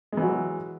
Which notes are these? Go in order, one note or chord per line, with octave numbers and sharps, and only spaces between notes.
E3 F#3 G#3